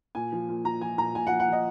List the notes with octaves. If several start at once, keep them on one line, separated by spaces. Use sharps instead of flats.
A#2 G#5
F3
A#2
F3 A#5
F3 G#5
A#2 A#5
A#2 G#5
F#5
F3
F#5
F3 D#5